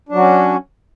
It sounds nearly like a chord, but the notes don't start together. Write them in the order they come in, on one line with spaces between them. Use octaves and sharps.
D4 F#3 F#4 C#4